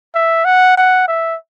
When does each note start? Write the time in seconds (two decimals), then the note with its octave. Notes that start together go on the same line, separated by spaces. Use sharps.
0.15 E5
0.45 F#5
0.77 F#5
1.08 E5